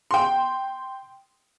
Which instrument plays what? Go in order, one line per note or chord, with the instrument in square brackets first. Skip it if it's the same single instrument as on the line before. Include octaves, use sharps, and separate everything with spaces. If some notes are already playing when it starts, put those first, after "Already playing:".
[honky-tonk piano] G5 C6